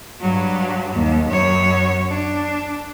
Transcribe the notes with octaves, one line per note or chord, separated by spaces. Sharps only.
G2 F#3
D#2
F#2 C#5
D4